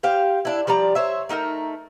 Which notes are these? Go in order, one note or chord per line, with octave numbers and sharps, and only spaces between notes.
G4 C5 F5 G5
D4 E4
F3 G3 D5 A#5
C5 C#5 E5
A3 D#4 F4 A#4